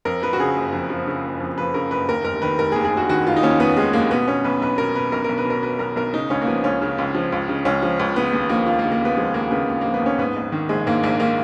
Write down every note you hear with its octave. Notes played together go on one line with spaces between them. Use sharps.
F2 A#4
F3 B4
F#4
C#3 G#4
F#1
F2
F3
C#3
F#1
F2
F3 B4
C#3 A#4
F#1 B4
D#2 A#4
F1 A#4
D#3 B4
F1 A#4
G#4
D#2
G#4
F1 F#4
D#3 F#4
F1 F4
D#4
D#2 C#4
F1 B3
D#3 G#3
F1 A#3
B2 B3
B2 C#4
B1 B4
B1 B4
B2 A#4
B2 B4
B1 A#4
B1 A#4
B4
B2 A#4
B2 B4
B1 A#4
B1 A#4
C#3 D#4
C#2 C#4
A#3
F3 B3
C#2 C#4
C#3
C#2
F3
C#2
C#3
C#2 C#4
F3
C#2
C#3 B3
D#2 B3
F3 A#3
D#2 F4
A#3
C#3
A#3
D#2 B3
F3 G#3
D#2 A#3
C#3 B3
D#2
F3 A#3
B3
D#2 C#4
G#2 B3
A#1
D#3
A#1 G#3
G#2 A#3
A#1 A#3
D#3 A#3